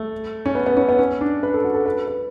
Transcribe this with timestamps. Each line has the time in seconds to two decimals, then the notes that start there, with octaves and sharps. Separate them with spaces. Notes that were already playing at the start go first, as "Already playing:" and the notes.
Already playing: A3
0.46 C#4
0.55 B3
0.66 B3
0.77 C#4
0.89 B3
0.99 C#4
1.21 D4
1.43 B4
1.54 A4
1.64 F#4
1.74 A4
1.86 B4
2.08 B4